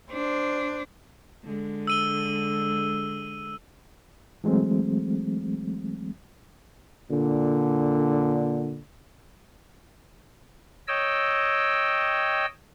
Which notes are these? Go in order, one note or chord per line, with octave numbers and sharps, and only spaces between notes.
D4 C5
D3 G#3
E6 D#7 G7
E3 F#3 G#3 A3 C4
A#2 D3
C#5 D#5 G5 E6